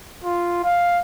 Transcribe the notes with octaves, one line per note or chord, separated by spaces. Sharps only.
F4
F5